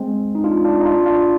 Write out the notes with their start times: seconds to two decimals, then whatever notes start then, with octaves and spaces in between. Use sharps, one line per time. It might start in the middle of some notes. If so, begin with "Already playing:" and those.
Already playing: G#3 C4
0.35 D#4
0.44 D4 F4
0.64 D4 F4
0.81 D#4
0.85 D4 F4
1.06 D4 F4